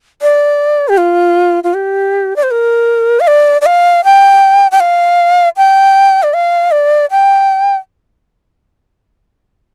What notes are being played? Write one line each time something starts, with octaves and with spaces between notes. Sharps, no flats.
D5
G4
F4
F4
G4
D5
C5
A#4
F5
D5
D5
F5
G5
G5
F5
G5
D5
F5
D5
G5